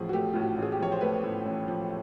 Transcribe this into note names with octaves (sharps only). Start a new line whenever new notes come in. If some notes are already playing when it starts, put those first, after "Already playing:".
Already playing: A1 A2 F3 G#4
F#4
A3 G4
A2 F4
F#4
A1 G#4
G4
F3 C#5
C5
A3 B4
A2
A1
F3